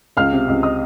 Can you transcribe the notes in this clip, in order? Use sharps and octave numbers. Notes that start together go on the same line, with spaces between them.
C#2 F5 F6
C3
C#2
D#5 D#6